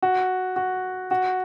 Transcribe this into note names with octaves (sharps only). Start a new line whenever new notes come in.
F#4
F#4
F#4